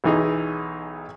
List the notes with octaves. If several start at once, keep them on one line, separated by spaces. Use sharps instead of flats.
B1 E3 D#4 G#4